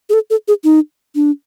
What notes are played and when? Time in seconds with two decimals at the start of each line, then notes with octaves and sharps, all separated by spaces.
0.10 G#4
0.13 A4
0.30 A4
0.48 G#4
0.64 D#4
1.15 D4